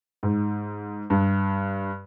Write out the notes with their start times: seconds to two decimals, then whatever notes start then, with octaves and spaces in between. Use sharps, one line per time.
0.23 G#2
1.10 G2